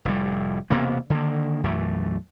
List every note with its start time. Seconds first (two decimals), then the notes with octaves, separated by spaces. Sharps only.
0.05 F1 A2 G3
0.70 E1 C3 A#3 B3
1.10 D3 D#3 A#3
1.64 B1 F#2 E3 A3